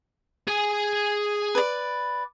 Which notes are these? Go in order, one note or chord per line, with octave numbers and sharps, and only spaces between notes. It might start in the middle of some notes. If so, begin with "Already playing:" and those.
G#4 G#5
B4 D5